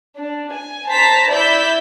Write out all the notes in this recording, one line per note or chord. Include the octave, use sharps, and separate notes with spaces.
D4
G#5
C5 A5 A#5 B6
E4 D5 E6 G6 B6